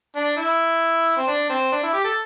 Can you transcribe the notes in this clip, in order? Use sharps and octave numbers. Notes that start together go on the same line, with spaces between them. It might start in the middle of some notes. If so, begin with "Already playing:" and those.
D4
E4
C4
D4
C4
D4
E4
G4
A4